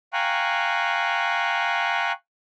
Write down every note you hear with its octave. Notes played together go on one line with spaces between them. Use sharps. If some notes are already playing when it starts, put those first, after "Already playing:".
F5 G5 G#5 A#5 C#6 F#6